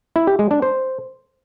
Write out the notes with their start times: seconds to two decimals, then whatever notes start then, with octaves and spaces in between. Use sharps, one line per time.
0.16 E4
0.27 G4
0.39 G#3
0.51 D4
0.62 C5